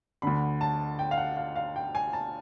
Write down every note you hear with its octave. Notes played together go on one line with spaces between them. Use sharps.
D2 D3 B5
A5
G5
F5
F#5
F5
F5
G5
G#5
A5